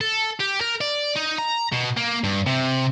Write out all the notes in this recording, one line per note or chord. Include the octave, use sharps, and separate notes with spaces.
A4
G4
A#4
D5
D#4
A#5
B2
A#3
G2
C3